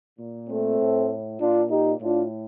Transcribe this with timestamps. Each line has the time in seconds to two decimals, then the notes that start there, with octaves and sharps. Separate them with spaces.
0.19 A#2
0.49 A3 C4
0.80 A2
1.39 A#2 D4 F4
1.70 D#4 G4
2.00 A2 D4 F4